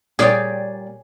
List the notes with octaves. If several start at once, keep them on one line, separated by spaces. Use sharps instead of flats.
A#2 G3 G#4 C#5 D5 G5